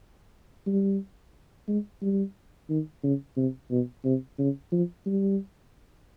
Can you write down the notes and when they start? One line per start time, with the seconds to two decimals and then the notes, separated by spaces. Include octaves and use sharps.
0.67 G3
1.68 G#3
2.02 G3
2.70 D#3
3.03 C#3
3.37 C3
3.71 B2
4.05 C3
4.39 C#3
4.72 F3
5.06 G3